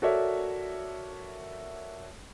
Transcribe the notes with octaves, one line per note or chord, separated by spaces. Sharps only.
F#4 A4 A#4 C#5 D5 E5